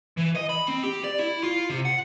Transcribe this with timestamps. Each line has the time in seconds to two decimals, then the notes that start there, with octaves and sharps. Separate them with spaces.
0.17 E3
0.36 D#5
0.49 B5
0.68 C4
0.83 G4
1.04 D5
1.19 E4
1.43 F4
1.70 C3
1.85 F#5